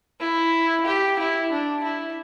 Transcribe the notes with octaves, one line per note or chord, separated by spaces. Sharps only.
E4
G4
E4
D4
E4